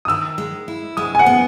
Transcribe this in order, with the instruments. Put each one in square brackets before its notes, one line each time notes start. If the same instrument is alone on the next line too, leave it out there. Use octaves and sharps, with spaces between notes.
[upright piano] D#6
[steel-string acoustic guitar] D#3 [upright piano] E6
[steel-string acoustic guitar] G#3
E4
[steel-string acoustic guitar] G#3 [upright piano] D#6
[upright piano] G#5
F#5
[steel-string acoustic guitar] B3